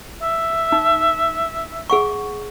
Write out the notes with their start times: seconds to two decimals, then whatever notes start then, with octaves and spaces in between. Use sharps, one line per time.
0.20 E5
0.72 D#4
1.90 G#4 F#5 C#6